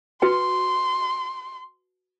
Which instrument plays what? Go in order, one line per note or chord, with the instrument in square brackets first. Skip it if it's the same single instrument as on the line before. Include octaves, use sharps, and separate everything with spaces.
[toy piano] F#4 B4 G5 [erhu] C6